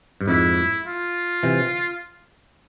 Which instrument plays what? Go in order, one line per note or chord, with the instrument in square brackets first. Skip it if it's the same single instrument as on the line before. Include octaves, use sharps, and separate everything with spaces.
[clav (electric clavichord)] G2
[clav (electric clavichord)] F2 G#2 [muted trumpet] E4
[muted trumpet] F4
[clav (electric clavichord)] C3 E3